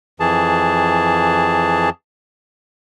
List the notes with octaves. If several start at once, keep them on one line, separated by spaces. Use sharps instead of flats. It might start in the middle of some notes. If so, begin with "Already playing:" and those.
F2 E3 G#4 A5